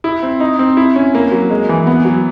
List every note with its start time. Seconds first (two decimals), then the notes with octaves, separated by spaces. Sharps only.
0.04 E4
0.23 C4
0.40 D#4
0.59 C4
0.77 E4
0.96 C#4
1.15 A#3
1.32 F#3
1.50 G#3
1.69 E3
1.87 B3
2.05 F#3